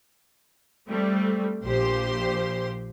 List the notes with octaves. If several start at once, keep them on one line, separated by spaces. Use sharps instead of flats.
G3 A3 C4
A#1 A#2 F3 G4 C5 C6